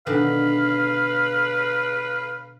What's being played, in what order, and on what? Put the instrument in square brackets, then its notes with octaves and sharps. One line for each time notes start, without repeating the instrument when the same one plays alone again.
[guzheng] B2 D3 D#3 [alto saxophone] B4 [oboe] F5